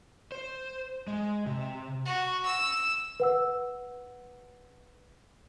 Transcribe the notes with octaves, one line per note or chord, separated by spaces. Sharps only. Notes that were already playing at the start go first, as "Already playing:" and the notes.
C5
G#3
C3
F#4
E6
B4 F#5 E6